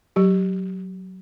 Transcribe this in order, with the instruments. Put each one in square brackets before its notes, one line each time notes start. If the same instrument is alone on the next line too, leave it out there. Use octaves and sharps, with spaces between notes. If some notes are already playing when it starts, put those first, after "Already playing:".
[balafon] F#3 G4